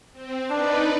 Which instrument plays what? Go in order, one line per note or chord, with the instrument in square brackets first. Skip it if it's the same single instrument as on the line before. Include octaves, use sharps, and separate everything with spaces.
[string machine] C4
[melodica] D4 [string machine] D#4 B4 D5